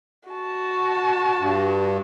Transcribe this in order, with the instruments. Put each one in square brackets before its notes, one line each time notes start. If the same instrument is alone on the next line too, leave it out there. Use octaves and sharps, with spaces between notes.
[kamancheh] F#4 A5
[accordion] G2